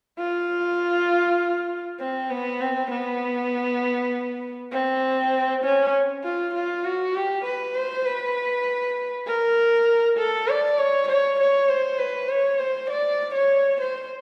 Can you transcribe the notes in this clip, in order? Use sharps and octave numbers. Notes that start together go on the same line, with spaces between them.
F4
C4
B3
C4
B3
C4
C#4
F4
F4
F#4
G4
B4
C5
B4
A#4
A4
D5
C#5
C#5
C#5
C5
B4
C#5
C5
D5
C#5
C5